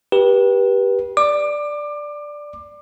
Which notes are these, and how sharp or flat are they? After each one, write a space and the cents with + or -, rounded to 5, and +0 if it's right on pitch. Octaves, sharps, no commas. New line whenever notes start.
G4 +0 B4 -30
D5 +0 D6 +25